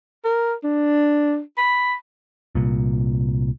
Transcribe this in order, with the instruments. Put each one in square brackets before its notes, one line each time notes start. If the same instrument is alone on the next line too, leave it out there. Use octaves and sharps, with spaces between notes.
[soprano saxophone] A#4
D4
B5
[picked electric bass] C2 A#2